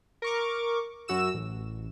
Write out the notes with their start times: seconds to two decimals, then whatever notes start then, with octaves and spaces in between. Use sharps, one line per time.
0.22 A#4 C#6 D6
1.08 F#2 F#4 E6 E7
1.34 A1